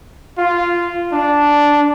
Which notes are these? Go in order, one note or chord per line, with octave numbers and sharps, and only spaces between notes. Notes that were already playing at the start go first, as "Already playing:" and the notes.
F4
D4